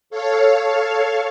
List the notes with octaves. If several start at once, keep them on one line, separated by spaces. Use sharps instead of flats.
A4 C#5 F5